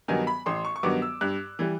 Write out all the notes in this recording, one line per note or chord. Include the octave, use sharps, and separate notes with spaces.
G2 D#3 F#3 B3 G#5
B5
A1 C6
C#6
C#6
G2 D#3 F#3 B3 D6
E6
G2 F#6
E3 G3